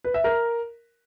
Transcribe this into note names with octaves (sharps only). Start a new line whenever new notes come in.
B4
E5
A#4